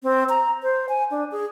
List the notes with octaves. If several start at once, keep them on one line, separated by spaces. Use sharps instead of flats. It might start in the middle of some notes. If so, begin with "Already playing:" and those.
C4
A#5
C5
G#5
D4
G#4